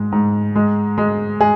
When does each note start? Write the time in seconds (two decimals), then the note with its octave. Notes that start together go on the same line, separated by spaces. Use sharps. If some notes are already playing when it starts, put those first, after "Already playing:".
Already playing: G#2 G#3
0.12 G#2
0.56 G#3
0.98 G#3
1.40 G#3 G#4